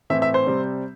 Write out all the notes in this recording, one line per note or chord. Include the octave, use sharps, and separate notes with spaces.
A2 E3 C4 E5
E5
C5
C3 G3 C4